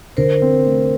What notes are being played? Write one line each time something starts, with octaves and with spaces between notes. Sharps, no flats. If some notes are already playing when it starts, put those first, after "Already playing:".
D3 A#4 C5
C4
A3